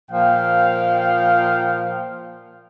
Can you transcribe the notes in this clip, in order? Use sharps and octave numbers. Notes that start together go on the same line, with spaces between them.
A#2 F3 F5 G5